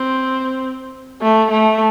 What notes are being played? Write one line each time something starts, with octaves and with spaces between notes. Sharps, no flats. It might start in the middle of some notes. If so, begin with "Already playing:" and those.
Already playing: C4
A3
A3